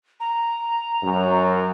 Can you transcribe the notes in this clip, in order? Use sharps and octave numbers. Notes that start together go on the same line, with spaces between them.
A#5
F#2